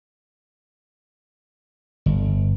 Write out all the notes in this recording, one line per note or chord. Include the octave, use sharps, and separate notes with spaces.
G1